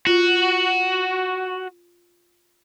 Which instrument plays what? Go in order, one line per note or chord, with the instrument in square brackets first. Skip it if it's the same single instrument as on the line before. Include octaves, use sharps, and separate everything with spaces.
[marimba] F4 [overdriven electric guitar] F#4